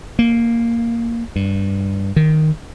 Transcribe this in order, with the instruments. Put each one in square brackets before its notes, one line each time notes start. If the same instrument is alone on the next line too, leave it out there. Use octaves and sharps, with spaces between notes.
[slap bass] A#3
G2
D#3